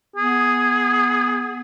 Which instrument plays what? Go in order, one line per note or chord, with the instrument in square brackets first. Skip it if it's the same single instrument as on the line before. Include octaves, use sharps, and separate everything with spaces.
[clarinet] B3 [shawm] G#4